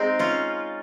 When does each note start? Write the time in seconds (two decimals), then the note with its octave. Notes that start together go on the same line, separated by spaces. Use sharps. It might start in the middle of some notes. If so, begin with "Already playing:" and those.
Already playing: G#3 C4 D#4
0.19 C#4 F4